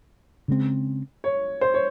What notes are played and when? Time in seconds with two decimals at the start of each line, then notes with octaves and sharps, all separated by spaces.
0.48 C#3 G#3 C4
1.24 C#5
1.61 C5
1.74 C#5